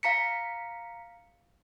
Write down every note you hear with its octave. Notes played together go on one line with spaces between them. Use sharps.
F5 A#5 B6 C#7